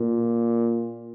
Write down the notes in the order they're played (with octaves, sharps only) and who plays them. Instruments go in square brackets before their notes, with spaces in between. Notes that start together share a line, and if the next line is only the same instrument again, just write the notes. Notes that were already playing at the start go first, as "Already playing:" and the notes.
Already playing: [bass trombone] A#2